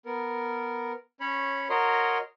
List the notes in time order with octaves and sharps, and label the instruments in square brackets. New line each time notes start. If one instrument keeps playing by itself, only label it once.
[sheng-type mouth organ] B3 A#4
C#4 C#5 B5
F#4 A#4 C#5 D#5 A#5 C6